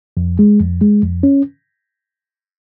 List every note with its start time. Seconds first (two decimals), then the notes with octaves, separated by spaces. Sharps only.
0.17 F2
0.39 G#3
0.60 F2
0.81 G#3
1.03 F2
1.23 C#4